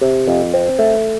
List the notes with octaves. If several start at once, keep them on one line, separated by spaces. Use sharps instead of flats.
C3
F2
C4
A3